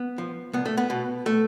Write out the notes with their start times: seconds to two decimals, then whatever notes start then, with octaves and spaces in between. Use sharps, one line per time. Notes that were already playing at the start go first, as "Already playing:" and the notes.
Already playing: B3
0.18 F3
0.53 C2 B3
0.66 A3
0.77 B3
0.90 B2
1.26 A3